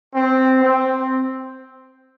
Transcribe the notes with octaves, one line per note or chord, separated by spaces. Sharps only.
C4
C4